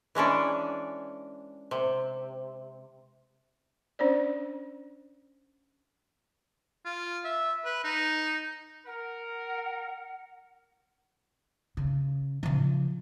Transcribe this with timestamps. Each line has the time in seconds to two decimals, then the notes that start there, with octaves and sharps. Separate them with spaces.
0.15 E3 G#3 C#4 D4
1.71 C3
3.99 C#4 D4 C5 D5
6.86 F4
7.25 E5
7.65 B4
7.84 D#4
8.86 A#4 F#5
11.77 C#3
12.43 C#3 F3